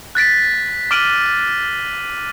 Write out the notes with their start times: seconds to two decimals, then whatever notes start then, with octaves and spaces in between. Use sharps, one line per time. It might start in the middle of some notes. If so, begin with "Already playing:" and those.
0.15 F#6 A6 B6 D7
0.91 D6 F6 B6 D7 D#7 F#7